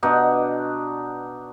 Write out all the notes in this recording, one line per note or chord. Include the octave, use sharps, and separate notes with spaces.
B2 D4 D#4 F#5